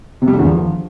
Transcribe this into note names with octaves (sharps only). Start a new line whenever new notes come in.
C3
G3
D3
E2
F3